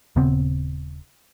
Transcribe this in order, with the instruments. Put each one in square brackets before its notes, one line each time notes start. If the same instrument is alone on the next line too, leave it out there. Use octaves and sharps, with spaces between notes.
[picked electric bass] D#1 C#3 B3 C4